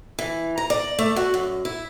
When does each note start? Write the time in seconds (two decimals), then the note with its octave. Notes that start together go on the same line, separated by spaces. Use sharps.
0.19 E3
0.58 A#5
0.70 D5
0.99 A3
1.16 F#4
1.34 F#2
1.65 E4